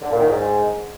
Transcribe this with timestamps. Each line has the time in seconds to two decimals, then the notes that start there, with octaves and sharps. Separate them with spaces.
0.01 D3
0.10 A#2
0.19 D#3
0.28 G#2